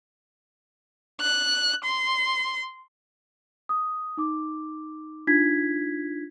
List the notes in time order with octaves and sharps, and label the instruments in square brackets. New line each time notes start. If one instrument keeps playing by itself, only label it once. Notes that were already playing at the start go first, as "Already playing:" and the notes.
[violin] F#6
C6
[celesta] D#6
D#4 D6
D4 D#4 F4 G#6 B6